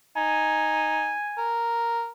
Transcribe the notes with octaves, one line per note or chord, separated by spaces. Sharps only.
D#4 G#5
A#4